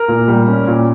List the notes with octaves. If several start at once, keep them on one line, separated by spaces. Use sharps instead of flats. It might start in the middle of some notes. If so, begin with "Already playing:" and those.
Already playing: A#4
A#2
G3
C#4
A#2